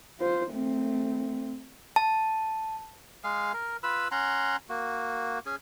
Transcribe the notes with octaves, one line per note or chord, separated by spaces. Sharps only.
F4 C5
A3 C4
A5
G#3 G#4 F5
A#4
F4 B4 B5 E6
C#4 F#5 A#5 C6
A#3 F#4
C#4 G#4